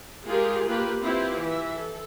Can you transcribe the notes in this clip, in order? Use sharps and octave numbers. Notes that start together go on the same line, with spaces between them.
G#3 F4 G4 G#4 A#4
A#3 F4 G4 B4
C4 E4 F4 G4 B4 C5
E3 E5
A4